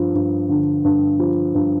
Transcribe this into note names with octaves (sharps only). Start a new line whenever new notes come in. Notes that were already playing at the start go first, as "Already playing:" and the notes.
Already playing: G2 F3
G2
D3
G2
F3
G2